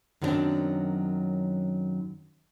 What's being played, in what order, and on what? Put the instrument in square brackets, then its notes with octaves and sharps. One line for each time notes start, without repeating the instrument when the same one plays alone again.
[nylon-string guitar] F#2 D#3 F#3 B3 C4 D4